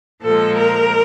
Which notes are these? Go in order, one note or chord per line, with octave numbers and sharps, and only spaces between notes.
A#2 F3 G#3 A4
A#4